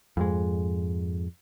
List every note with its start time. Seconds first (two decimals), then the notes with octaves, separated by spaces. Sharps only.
0.17 F2 G#2 G#3